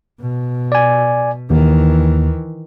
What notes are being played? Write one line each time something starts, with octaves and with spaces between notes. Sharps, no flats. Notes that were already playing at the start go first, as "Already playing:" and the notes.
B2
D5 G#5
D#2 D#3 E3